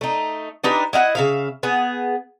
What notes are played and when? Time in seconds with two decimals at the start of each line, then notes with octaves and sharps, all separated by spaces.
0.01 A3 D#4
0.64 D4 D#4 G4 B4
0.93 E4 D#5 F5 F#5
1.15 C#3 E5 F5
1.63 B3 G#4